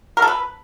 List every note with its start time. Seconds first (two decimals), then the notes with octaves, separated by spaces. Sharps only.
0.17 A#4
0.22 A4
0.28 B4